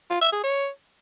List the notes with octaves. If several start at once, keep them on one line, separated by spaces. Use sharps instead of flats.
F4
E5
G#4
C#5